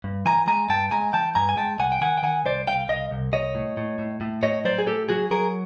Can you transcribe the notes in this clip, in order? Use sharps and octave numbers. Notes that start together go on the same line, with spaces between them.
G2
E3 G#5 A#5
G#3 G#5 A#5
G2 G5 A5
G#3 G#5 A#5
E3 G5 A5
G2 G#5 A#5
G#5
G#3 G5 A5
C2 F#5 G#5
G5
D#3 F#5 G#5
G5
D#3 F#5 G#5
C2 C5 D5
C2 F5 G5
C2 D#5 F5
C2
C2 C#5 D#5
A2
A2
A2
A2
A2 C#5 D#5
F#3 C5 D5
G#4
A2 G4 A4
F#3 F#4 G#4
F#3 G#4 A#4